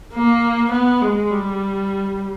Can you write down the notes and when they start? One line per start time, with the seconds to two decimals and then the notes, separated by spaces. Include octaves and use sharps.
0.14 A#3
0.72 B3
1.02 G#3
1.31 G3